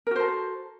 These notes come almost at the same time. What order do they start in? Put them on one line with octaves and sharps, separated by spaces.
A#4 F#4 C5 A4